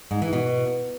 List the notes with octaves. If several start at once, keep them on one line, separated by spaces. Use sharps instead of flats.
G#2
E3
B2